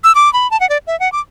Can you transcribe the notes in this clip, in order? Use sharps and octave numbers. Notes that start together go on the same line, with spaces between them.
E6
D6
B5
A5
F#5
D5
E5
F#5
D6